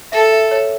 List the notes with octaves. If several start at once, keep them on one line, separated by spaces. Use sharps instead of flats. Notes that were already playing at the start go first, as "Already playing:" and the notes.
A4 E5
E5
C#5